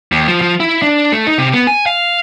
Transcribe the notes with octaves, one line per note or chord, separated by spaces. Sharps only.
D#2
F3
F3
E4
D4
A3
D#4
C3
B3
G#5
F5